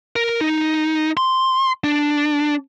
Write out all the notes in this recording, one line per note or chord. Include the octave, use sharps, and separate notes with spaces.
A#4
D#4
C6
D4